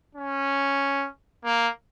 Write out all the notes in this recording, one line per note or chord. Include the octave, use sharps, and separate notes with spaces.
C#4
A#3